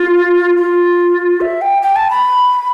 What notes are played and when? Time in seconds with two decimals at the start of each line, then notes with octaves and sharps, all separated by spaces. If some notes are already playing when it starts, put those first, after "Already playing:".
Already playing: F4
0.57 F4
1.41 E5
1.61 G5
1.82 G5
1.96 A5
2.10 B5